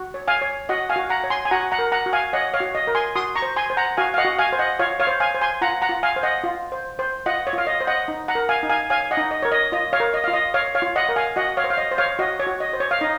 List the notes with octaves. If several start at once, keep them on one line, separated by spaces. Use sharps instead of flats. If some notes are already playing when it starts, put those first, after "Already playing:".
Already playing: F#4
C#5
F5 G#5
C#5
F#4 D#5 F#5
F5 G#5
F#4
F#5 A#5
C#5
G#5 C6
G#5
F#4 F#5 A#5
F#5 A#5
A#4
F#5 A#5
F#4
F5 G#5
C#5 D#5 F#5
C#5 F5
F#4
D#5
A#4
G#5 C6
F#4 C6 D#6
A#5 C#6
C5
G#5 C6
C5
F#5 A#5
F#4 F5 G#5
F5
D#5 F#5
F#4
F5 G#5
C5
D#5 F#5
F4 C#5 F5
C#5 F5
C5
F5 G#5
C5
G#5 C6
F4 F#5 A#5
F#5 A#5
F4
F5 G#5
C5
D#5 F#5
F4
C5
C5
F4 D#5 F#5
C#5
F4 F5
D#5
C5
D#5 F#5
D#4
F#5 A#5
A#4
F5 G#5
D#4
F5 G#5
C#5 F5 G#5
D#5 F#5
D#4
D#5
A#4 C#5
D#5
F4 D#5
C#5 F5
A#4
D#5
F4 F5
D#5
C#5 F5
C#5 F5
F4
D#5 F#5
A#4
F5 G#5
F#4 D#5 F#5
C#5 F5
C5
F5
D#5
C5
C#5 F5
F#4 D#5
C#5
F#4
D#5
C5
C#5
F5
D#4 D#5